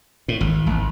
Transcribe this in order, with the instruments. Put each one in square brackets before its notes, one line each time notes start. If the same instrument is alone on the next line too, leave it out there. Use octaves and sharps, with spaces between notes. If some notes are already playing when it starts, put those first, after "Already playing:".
[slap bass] A2
G#1
G#1